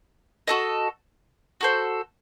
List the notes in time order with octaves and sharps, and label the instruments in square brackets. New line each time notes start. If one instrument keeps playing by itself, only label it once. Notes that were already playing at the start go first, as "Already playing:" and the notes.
[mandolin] F#4 A4 D#5
F#4 A4 C5